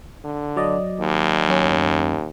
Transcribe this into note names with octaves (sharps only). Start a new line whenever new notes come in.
D3
F#3 D5 D#5
D#2
F#2 C#4